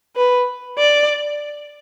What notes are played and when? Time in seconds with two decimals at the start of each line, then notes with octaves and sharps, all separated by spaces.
0.16 B4
0.78 D5